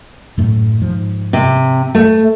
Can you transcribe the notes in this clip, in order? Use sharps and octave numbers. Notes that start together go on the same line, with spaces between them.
F#2 A2 A3
G#2 F3
C3
A3